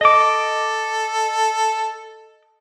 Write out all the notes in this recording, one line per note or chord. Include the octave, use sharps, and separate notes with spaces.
A4 D#5 D6